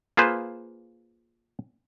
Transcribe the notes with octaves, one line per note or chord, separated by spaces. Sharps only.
A#3 F4 G#4 B4 C5